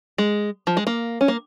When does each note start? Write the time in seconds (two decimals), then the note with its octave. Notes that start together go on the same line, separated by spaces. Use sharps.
0.18 G#3
0.67 F3
0.77 G#3
0.87 A#3
1.21 C#4
1.28 A#3